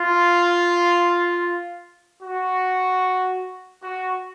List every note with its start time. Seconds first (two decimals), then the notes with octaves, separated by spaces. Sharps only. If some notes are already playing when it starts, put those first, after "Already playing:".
Already playing: F4
2.23 F#4
3.83 F#4